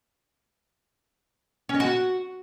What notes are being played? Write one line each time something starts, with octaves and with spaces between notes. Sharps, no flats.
C#4
D#5
F#4